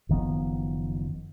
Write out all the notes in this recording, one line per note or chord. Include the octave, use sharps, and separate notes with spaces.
F#1 D#3 F3 B3